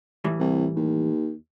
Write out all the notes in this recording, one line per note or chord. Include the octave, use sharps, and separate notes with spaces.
A2 E3 G3
C2
D#2